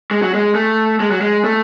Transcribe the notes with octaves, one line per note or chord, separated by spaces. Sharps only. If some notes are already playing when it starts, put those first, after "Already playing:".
G#3
F#3
G#3
A3
G#3
F#3
G#3
A3